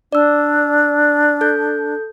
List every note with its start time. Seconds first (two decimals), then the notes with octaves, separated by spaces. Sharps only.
0.13 D4 D5 E6
1.41 A4 G6